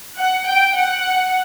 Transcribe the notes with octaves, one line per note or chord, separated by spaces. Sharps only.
F#5
G5
F#5